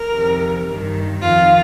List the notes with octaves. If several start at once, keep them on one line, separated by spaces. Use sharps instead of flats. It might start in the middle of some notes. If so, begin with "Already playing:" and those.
Already playing: A#4
F2 C3 D#3
G2 D#3
F2 D#3 F4